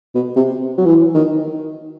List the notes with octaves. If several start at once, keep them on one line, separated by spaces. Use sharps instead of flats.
B2
C3
F#3
E3
D#3